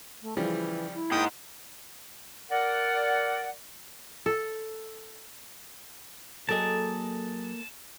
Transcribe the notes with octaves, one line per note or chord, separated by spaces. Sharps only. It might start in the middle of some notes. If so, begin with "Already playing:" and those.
A3
C#3 E3 F3 G3
E4
G#2 A#3 G#4 G5 D#6
A#4 D5 F#5
A4
F#3 A#3 G#4 A4 D#5 A5